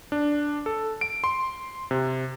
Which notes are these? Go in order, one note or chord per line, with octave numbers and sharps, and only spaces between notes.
D4
A4
D7
C6
C3